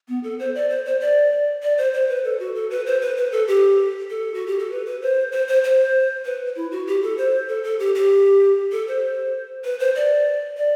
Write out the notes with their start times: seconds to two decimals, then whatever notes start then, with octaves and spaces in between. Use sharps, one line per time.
0.08 B3
0.24 A4
0.39 C5
0.55 D5
0.69 C5
0.86 C5
1.01 D5
1.62 D5
1.78 C5
1.94 C5
2.09 B4
2.24 A4
2.40 F#4
2.55 A4
2.71 B4
2.86 C5
3.02 B4
3.17 B4
3.32 A4
3.48 G4
4.10 A4
4.34 F#4
4.47 G4
4.59 A4
4.71 B4
4.86 B4
5.02 C5
5.32 C5
5.48 C5
5.64 C5
6.25 B4
6.56 E4
6.72 F#4
6.87 G4
7.03 A4
7.18 C5
7.49 A4
7.64 A4
7.79 G4
7.95 G4
8.72 A4
8.88 C5
9.65 B4
9.79 C5
9.96 D5
10.57 D5